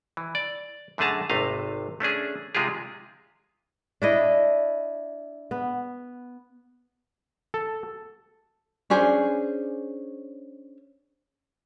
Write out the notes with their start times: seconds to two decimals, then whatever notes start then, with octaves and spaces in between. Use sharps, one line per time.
0.17 E3
0.35 D5
0.98 F#2 D3 A3 G#4 A5 A#5
1.30 G#1 C3 A3 D#5 F5
2.00 A3 C#4 D4 G#4
2.55 C3 G#3 F4 G4 G#4
4.02 D4 E4 D#5
5.51 B3
7.54 A4
8.90 C#4 D4 G#4 C5